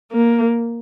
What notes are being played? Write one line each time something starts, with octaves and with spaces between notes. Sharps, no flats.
A#3